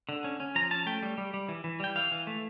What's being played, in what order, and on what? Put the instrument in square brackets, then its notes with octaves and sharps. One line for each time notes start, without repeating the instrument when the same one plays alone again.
[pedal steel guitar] D3
C#4
C#4
F3 A#5
C#4 A5
A3 G5
G3
G3
G3
E3
E3
G3 G5
E3 F5
E3
A3